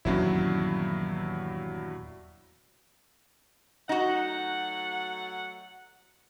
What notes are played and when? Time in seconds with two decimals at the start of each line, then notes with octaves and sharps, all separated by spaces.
0.05 D#1 E2 G2 F#3 C#4 E4
3.89 F#3 A3 D#4 F#4 F#5